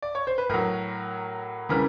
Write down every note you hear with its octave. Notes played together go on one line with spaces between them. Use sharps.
D5
C#5
C5
B4
A2 F#3 A#4
C#3 E3 G3 A#4